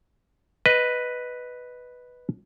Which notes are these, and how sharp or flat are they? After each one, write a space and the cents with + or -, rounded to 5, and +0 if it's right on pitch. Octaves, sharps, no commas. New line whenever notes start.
B4 +0 D#5 +0